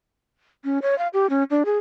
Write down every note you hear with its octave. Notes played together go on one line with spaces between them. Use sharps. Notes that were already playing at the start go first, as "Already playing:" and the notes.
C#4
C#5
F5
G4
C#4
D4
G#4